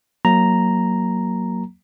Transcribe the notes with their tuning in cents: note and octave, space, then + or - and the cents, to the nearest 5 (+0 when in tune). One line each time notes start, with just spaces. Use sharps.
F#3 +0 A#3 +0 A#5 +0